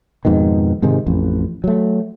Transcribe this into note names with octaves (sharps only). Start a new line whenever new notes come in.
F2 G#2 B2 D#3
G#2 C3 D#3 G#3
A1 F2
F#3 A3